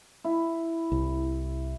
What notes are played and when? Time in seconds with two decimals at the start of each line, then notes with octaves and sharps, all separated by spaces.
0.24 E4
0.92 C2